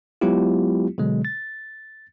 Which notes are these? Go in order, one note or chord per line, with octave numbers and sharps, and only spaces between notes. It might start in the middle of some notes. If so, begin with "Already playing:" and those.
F#3 G#3 B3 E4 F4 G4
B2 D3 F#3 G#3
A6